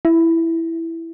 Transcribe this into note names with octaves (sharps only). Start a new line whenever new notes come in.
E4